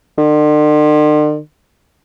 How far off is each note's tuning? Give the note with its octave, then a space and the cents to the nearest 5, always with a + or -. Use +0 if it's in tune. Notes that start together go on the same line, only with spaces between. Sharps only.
D3 +45